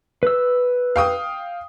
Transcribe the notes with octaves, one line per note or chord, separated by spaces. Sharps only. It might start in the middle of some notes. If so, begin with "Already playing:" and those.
B4 E6
F5 G5 D#6